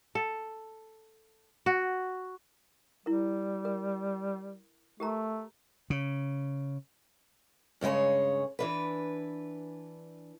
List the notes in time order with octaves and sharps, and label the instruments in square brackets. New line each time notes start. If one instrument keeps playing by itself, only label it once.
[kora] A4
F#4
[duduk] G3 [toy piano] E4 A#4
[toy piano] A#4
[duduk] A3 [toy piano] G4 A#4 A#5
[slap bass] C#3
[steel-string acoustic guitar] G2 C#3 G#3 G#4 C#5
E3 D4 B4